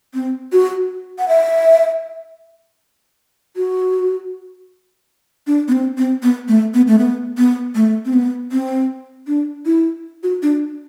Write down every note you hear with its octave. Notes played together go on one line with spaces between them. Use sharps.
C4
F#4
F#5
E5
F#4
D4
B3
C4
C4
B3
A3
B3
A3
B3
B3
A3
C4
B3
C4
D4
E4
F#4
D4